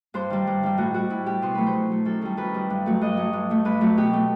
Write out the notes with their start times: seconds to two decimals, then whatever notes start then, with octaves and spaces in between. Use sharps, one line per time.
0.14 G2 C5
0.30 D#3 G3
0.47 G2
0.63 D#3 G3
0.78 A2 F#4
0.94 G3 F#4
1.10 A2 E4
1.26 G3 G4
1.42 B2 C5
1.55 F#3 A3 B4
1.67 C5
1.73 B2
1.90 F#3 A3
2.05 F#2 A4
2.21 D#3 G3 A4
2.37 F#2 B4
2.54 D#3 G3
2.70 G2
2.86 F#3 A3
3.01 G2 D#5
3.17 F#3 A3
3.33 G2
3.50 F#3 A3
3.65 G2 B4
3.81 F#3 A3
3.98 B2 G4
4.13 A3